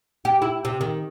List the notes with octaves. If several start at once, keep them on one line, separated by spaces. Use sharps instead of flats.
G4
E4
C3
D#3